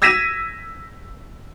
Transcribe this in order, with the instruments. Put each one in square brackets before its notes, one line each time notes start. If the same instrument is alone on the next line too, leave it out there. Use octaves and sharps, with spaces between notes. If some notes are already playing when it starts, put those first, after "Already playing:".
[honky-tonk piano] E6 G#6 A#6 B6 D#7 E7